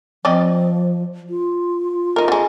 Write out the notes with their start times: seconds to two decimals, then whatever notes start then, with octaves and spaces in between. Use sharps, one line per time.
0.25 F3 C4 D5 D#5
1.30 F4
2.16 D#4 A#4
2.28 D3 G#3